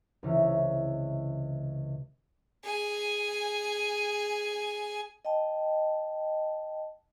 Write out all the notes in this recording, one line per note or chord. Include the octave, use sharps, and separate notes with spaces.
C#2 C3 E3 C#4
G#4 G#5
D#5 G5 A5